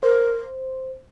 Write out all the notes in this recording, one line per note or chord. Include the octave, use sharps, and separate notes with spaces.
A#4 C5